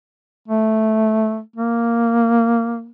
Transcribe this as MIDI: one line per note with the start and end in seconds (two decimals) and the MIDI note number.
0.48 1.41 57
1.56 2.91 58